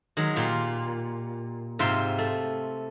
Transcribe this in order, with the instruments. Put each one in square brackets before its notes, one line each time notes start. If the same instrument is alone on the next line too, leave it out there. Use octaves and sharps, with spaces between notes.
[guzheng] D#3 F#3 G#3
A#2 F4 G4
G#2 C3 F4 E5 G5 C6
A3